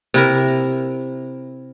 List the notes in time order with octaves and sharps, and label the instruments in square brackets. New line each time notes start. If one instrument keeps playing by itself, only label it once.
[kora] C3 E4 A#4